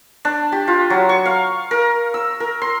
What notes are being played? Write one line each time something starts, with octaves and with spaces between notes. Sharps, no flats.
D4
G4
F4
F#3
C#6
F5
A#4
E6
A#4
C6